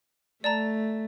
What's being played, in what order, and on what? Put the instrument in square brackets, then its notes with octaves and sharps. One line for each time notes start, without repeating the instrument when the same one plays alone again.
[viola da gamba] A3 [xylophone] D5 A5 A#5